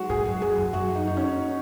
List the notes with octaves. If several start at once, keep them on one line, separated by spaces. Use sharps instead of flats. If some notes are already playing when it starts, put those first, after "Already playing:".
Already playing: F#3 G#3 F#4
G#2 G#4
F#2
F#2 G#4
F#2
F#2 F#4
D#4
D#4
C#4